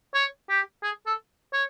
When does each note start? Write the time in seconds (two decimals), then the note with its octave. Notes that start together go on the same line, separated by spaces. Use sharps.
0.14 C#5
0.50 G4
0.83 G#4
1.07 A4
1.53 C#5